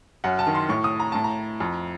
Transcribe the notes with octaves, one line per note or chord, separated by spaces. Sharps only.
F#2 F#5
A5
D#3
C6
A2 C#6
D#6
A#5
A2 A5
A#5
F2